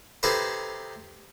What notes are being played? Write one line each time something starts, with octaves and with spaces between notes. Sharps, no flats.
C3 D#4 G#4 A4 B4 C5